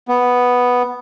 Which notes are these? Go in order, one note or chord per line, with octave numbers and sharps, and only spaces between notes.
B3